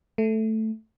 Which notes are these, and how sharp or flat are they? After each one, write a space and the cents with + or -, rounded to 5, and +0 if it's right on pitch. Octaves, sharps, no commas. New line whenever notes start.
A3 +0